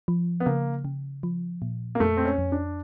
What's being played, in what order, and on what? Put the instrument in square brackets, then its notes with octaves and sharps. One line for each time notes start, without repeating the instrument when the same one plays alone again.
[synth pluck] F3
[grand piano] B3
[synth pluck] C#3 [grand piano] A#3
[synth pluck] C#3
F3
A#2
[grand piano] A#3
[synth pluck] F2 [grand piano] A3
[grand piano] C4
C#4
[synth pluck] F2
[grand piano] D4